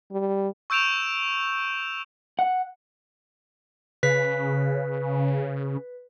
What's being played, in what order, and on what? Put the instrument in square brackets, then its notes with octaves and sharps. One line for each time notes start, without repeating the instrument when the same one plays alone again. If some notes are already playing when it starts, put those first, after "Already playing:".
[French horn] G3
[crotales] C#6 E6 G6 D7 E7 F7
[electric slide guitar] F#5
[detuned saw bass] C#3 [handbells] B4 B6